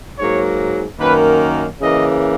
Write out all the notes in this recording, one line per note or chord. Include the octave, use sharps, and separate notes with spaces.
G#2 F#3 A#3 C#5
F#2 D#3 A#3 B4
C#3 E3 A#3 D#5